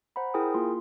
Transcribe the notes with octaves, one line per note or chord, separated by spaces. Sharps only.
C5 F#5 A#5 B5
E4 G#4 A#4 G5 G#5 D#6
A#3 F4 C6